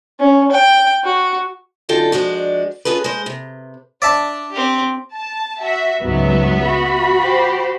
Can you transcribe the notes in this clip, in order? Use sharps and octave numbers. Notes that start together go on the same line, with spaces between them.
C#4
G5
F#4
F#2 D3 D#4 F4 A4 G5
F3 G#3 D4 F#4
C#4 F4 G#4 A4 B4
G#3 C5
C3
D4 D5 E5 A5
C4 G4
A5
F#4 E5
C#2 G#2 F#3 B3 E5
F#4 B5
G4 C5